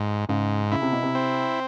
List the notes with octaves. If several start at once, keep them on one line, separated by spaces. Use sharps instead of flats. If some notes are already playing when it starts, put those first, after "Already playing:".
Already playing: G#2
G#2 C#3
C#3 E4
C3
B2
C3
C4